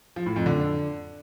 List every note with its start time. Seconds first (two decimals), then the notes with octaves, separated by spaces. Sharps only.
0.16 F3
0.26 A2
0.36 F2
0.46 D3